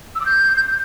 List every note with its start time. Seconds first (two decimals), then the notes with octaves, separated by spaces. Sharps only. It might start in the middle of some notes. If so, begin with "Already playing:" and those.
0.15 E6
0.20 D6
0.26 G6